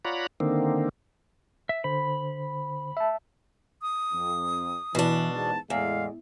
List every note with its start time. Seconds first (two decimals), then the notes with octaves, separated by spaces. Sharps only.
0.05 F4 C#5 D5 F#5 A#5 B5
0.40 D3 D#3 A#3 C4
1.69 E5
1.84 D3 C5 B5
2.97 E5 A5
3.82 D#6
4.13 F2
4.95 B2 E3 D4
5.32 E2 G#2 A5
5.70 E2 A2 G#3 F5